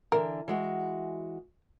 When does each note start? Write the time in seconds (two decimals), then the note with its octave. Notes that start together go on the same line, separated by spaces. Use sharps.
0.12 D3 E3 A#4
0.48 E3 G#3 F#4